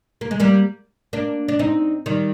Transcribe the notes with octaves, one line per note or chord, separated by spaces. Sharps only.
A#3
G#3
G3 A#3
A#3 D4
D4
C4 D#4
D#3 G3